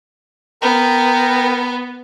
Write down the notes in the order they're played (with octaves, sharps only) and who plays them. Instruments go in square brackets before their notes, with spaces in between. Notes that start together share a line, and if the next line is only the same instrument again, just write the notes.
[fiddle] B3 [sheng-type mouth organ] A#4 G5 A#5